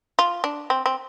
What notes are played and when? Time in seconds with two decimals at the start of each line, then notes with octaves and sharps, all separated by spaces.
0.19 F4
0.44 D4
0.70 C4
0.86 C4